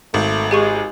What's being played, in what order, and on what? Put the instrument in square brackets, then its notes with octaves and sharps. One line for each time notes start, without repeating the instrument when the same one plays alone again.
[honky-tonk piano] G#1 [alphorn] A3
[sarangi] G#3 [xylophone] G4 G#5 C#6 [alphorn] G#4